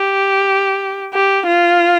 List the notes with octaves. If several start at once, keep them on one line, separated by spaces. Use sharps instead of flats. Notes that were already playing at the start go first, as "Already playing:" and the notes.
Already playing: G4
G4
F4